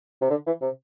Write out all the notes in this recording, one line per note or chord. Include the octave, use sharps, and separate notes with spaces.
C3
D3
E3
C3